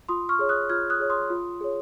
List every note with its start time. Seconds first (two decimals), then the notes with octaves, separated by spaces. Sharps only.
0.09 F4 C6 D#6
0.29 C#6 F6
0.39 G#4 C#5
0.49 D#6 F#6
0.69 F4 F6 G#6
0.90 D#6 F#6
1.00 G#4 C#5
1.10 C6 D#6
1.30 F4
1.61 G#4 C#5